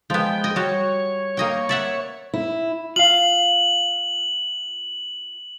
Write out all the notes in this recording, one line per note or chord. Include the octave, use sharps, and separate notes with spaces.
F3 G#3 B3 G5
D#5
G3 F#4 C#5
A#3 D#5 G5
D5 E5 F#5
E4
F4 F5 F#7